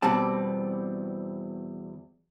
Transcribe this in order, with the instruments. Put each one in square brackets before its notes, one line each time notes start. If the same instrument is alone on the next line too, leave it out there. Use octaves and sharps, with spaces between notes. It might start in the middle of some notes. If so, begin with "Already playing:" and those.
[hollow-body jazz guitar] E2 B2 G3 C4 A5